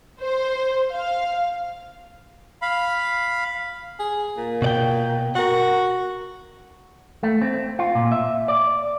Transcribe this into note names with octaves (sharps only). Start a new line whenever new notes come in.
C5
F5
F5 B5
G#4
A#2
B2 D5 G5
F#4 A#4 F#5
A3
C4
F4
A#2
E5
D5